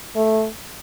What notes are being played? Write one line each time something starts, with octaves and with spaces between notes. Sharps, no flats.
A3